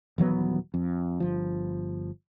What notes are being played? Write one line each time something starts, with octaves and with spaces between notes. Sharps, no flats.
D#1 E3 F#3 B3
F2
G1 F3